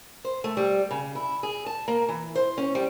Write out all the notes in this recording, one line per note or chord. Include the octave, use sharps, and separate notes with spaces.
C5
A3
G3
C#3
E4
G#4
A5
A#3
E3
C5
C#4
G3